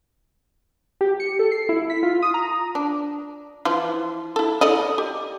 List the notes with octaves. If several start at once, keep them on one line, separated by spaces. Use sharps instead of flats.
G4
C#7
A4
C7
E4
B6
F4
D#6
A#5
D4
E3 F3 F4
E4 A4
A4 D5 D#5
G4